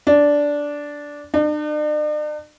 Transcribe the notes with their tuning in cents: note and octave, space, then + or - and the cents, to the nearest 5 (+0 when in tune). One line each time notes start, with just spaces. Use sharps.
D4 -10
D4 +45